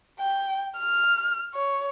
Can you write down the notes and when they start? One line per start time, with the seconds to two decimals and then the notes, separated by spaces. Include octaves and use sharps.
0.20 G5
0.79 F6
1.54 C#5